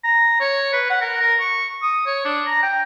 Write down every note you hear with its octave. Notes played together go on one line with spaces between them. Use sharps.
A#5
C#5
B4
F#5
A#4
A#4
C#6
D#6
C#5
D4
A#5
G5